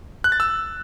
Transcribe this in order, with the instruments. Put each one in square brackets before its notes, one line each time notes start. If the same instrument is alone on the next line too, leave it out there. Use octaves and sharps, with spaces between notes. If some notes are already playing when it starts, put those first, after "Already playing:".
[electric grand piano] F#6
A6
E6